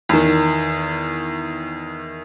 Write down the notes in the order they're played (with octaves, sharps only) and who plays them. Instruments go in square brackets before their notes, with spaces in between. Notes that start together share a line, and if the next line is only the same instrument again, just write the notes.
[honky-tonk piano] E2 D#3